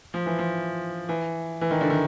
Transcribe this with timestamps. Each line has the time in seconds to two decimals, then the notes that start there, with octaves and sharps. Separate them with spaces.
0.14 F3
0.26 E3
0.39 F3
1.09 E3
1.61 E3
1.71 D#3
1.81 D3
1.90 D#3